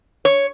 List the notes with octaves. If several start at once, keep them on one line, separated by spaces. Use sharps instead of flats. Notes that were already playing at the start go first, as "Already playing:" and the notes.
C#5